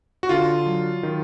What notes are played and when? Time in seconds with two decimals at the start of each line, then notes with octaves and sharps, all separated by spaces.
0.23 F#4
0.29 D3 F4
0.66 F#3
1.03 D#3